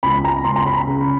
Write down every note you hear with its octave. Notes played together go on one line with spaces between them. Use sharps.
C#2 B5
A#5
C#2 C6
A#5
B5
C#3